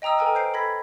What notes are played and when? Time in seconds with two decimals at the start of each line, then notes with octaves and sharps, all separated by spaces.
0.02 D#5 G5 A#5 D#6 E6
0.18 A4 B4 G5 G#5 A#5 F6
0.35 C5 G6 C7 D7
0.54 A4 B5 G#6 A#6 B6